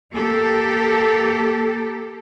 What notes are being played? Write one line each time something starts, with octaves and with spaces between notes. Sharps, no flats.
A#3 G4 A4